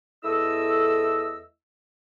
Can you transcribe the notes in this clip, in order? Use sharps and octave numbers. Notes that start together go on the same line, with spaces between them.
E2 A3 E4 A4 D#5 E6